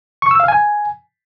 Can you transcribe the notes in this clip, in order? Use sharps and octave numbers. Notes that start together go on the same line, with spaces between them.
C#6
E6
F5
G#5